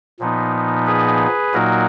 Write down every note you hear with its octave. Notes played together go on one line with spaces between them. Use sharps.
A#2 F3 B3 D#4
G#4 B4
A#2 F#3 A#3 D#4 F#4 A#4